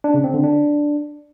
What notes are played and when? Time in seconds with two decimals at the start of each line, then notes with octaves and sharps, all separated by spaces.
0.04 D4
0.14 C#3
0.24 C4
0.34 D3
0.44 D4